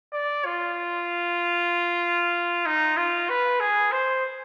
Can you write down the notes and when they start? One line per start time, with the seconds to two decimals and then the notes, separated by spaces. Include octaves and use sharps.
0.13 D5
0.45 F4
2.66 D#4
2.97 F4
3.29 B4
3.60 G#4
3.92 C5